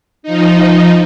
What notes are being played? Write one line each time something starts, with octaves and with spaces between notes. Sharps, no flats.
F3 D#4